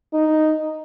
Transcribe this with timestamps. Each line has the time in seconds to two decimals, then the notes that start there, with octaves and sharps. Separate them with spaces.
0.13 D#4